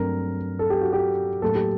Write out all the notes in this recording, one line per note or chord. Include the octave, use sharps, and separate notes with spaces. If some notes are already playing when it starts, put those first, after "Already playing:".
Already playing: G2 F#3 A3 C4 A#4
A4
G4
F#4
G4
A2 F#3 A#3 A4
G4